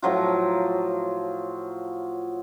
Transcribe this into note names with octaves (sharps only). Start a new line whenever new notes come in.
A2 F3 F#3 F4